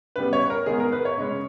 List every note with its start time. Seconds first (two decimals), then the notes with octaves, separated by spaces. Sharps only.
0.16 C#3 G3 B3 B4
0.33 C#5
0.50 A#4
0.66 D#3 G#3 B3 G#4
0.80 A#4
0.92 B4
1.05 C#5
1.17 C#3 G#3 C#4